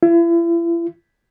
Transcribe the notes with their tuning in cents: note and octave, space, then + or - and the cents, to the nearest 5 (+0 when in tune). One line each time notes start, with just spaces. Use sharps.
E4 +40